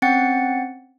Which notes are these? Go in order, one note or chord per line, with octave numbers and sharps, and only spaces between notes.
C4 C#4 F#5 G5 A6 C#7